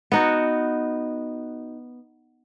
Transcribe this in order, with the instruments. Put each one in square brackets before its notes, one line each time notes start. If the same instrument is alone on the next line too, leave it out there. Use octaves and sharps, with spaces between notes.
[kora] B3 D#4 F#4